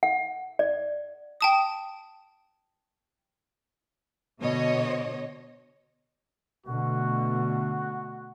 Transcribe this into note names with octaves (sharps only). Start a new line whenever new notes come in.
F#5
D5
G5 A5 D#6
B2 D3 C#5 D#5
B2 D3 A3 F#4